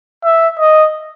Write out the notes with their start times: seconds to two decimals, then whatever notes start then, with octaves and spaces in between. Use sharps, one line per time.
0.24 E5
0.60 D#5